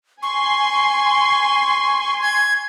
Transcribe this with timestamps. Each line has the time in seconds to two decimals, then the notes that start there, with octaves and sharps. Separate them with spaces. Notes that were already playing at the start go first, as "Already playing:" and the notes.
0.23 G#5 C6 C#6
2.22 G#6